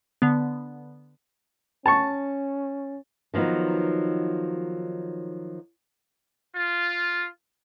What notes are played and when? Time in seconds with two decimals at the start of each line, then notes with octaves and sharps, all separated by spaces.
0.22 D3 B3
1.86 C#4 A5 C#6
3.34 D#3 F3 F#3 B3 D#4
6.54 F4